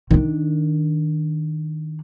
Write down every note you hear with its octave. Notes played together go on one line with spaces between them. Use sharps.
D#3 D4